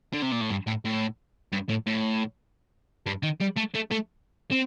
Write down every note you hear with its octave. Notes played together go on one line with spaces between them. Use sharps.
D3
C3
A#2
A2
G2
A2
A2
G2
A2
A2
G2
D#3
G3
A3
A3
A3
C4